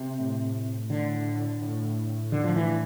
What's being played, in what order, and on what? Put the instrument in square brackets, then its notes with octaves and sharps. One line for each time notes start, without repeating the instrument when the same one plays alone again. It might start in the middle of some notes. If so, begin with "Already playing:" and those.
Already playing: [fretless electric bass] C3
[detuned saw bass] A2
[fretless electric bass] D3
[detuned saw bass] A2
[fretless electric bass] D3
F3
E3